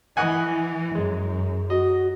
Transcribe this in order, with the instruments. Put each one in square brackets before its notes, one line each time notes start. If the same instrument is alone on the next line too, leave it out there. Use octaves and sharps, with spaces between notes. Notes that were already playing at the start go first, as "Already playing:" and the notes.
[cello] E3 [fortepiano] D#5 F#5 G#5
[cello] F#2 [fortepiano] G#3
[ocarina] F#4 [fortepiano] D#5